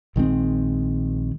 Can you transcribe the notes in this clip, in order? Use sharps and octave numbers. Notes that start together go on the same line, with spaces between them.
A#1 D#3 G#3 C4